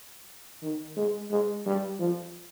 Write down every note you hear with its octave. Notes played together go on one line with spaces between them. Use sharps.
D#3
G#3
G#3
G3
F3